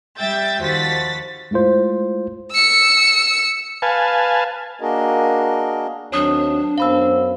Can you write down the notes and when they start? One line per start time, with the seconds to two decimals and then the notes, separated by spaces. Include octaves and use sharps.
0.18 G3 E5 G5 G6 A6
0.61 D#2 F3 F#4 A6 B6
1.51 G#3 A3 E4 F4 C5
2.52 E6 C#7
3.82 B4 F5 G#5 A5
4.81 A#3 D4 F#4 G#4 A#4 D#5
6.12 D#2 F#3 C4 D4 C#5 D#6
6.78 F#2 B3 C5 F5 B5 E6